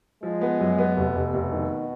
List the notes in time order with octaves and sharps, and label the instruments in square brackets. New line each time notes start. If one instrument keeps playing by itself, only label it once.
[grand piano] F3 [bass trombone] G#3
[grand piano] B3
F#2
B3
[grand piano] F1 [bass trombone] B2
[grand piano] F1
F1
D#3